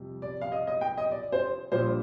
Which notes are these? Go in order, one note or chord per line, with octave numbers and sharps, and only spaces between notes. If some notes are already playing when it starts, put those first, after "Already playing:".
Already playing: F2 C3 G3
D5
F5
D#5
D#5
G5
D#5
D5
C5
A#1 A#2 G3 C5